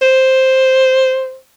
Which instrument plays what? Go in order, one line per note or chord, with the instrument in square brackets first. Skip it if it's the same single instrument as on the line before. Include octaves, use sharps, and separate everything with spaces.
[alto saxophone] C5